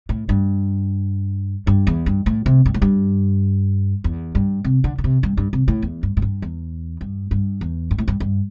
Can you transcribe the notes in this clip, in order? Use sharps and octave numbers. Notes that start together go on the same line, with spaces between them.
A2
G2
G2
E2
G2
A2
C3
G2
A2
G2
E2
G2
C3
D3
D3
C3
G2
G2
C3
A2
E2
G2
A2
G2
E2
G2
G2
E2
G2
A2
G2
G2